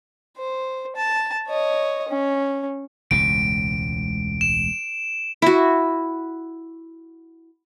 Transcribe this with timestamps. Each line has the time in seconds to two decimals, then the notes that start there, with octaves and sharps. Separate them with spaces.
0.37 C5
0.96 A5
1.48 C#5 D#5
2.09 C#4
3.11 E1 C#2 A2 D7
4.41 E7
5.42 E4 F#4